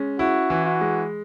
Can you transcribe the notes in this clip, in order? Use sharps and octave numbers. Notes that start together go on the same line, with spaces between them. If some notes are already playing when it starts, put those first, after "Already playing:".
Already playing: G#3 C#4
E4 F#4
E3
F#4
G#3